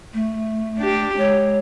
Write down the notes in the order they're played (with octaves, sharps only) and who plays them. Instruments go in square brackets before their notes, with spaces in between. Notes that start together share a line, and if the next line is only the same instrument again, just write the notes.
[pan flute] A3
[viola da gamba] D4 G4
[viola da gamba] G#3 [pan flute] C#5